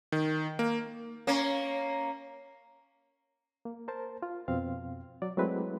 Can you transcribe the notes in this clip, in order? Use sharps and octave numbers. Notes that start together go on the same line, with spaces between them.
D#3
A#3
A#3 C#4
A#3
A#4 C5 A5
F4
F2 B2 C4 F5
F#3 D5
F#3 G#3 A3 C4 E4 B4